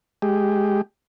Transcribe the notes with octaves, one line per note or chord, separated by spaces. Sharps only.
G#3 G4